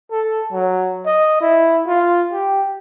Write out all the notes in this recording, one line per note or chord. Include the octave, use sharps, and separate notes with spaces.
A4
F#3
D#5
E4
F4
G4